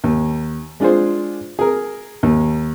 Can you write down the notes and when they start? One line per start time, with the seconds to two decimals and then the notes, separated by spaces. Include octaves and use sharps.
0.04 D#2
0.80 G#3 D4 F4 G#4 C5
1.59 G#4 A#4
2.23 D#2